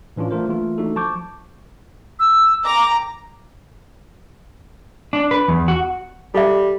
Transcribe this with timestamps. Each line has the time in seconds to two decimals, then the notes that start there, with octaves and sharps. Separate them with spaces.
0.16 A2 E3 C#4 D4 F4
0.31 A3 D4 F4 A#4 C5
0.49 E3 A3 A#3 F4
0.78 A3 D4 D#4 F#4 A4
0.96 F3 A5 C#6 D6 G6
2.19 E6
2.65 G5 A#5 D6
5.13 D4
5.31 B4
5.48 E2
5.68 F#4
6.34 G3 A4 E5